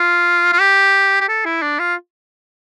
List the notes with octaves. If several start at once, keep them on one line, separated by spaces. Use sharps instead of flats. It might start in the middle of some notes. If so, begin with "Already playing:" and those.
Already playing: F4
F4
G4
G4
A4
E4
D4
F4